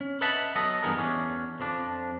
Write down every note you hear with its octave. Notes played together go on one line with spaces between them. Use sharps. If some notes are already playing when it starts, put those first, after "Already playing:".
C#4
B4 D#5 E5 F#5 A5 B5
F#3 B3 A4 D#5
G2 E3 B3 G#4 A#4 D#5
E2 C#4 D4
F2 F3 D4